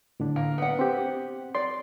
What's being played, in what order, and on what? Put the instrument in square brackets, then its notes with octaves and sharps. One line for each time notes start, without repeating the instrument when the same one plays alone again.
[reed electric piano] A2 D3 D4
[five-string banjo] A#3
B3 F#5
[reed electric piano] C4 G4
[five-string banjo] D5 [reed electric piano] C6